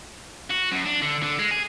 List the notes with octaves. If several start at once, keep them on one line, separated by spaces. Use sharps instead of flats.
F#4
F#2
D4
D3
D3
G#3
G#4